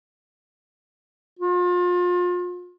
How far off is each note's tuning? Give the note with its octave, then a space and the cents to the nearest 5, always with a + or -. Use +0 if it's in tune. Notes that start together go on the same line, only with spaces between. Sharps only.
F4 +35